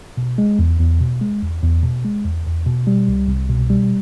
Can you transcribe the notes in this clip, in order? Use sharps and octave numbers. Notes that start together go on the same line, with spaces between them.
B2
G#3
E2
E2
B2
G#3
E2
E2
B2
G#3
E2
E2
B2
G3
C2
C2
B2
G3